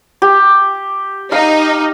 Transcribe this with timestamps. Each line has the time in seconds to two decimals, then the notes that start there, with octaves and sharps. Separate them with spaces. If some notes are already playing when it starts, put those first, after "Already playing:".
0.22 G4
1.32 D#4 F5